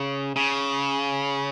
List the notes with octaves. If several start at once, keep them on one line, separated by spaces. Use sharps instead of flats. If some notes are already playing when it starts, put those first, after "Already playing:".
Already playing: C#3
C#3